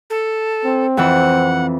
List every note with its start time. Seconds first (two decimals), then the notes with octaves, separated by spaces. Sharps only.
0.10 A4
0.65 C4
0.97 F2 E3 F#5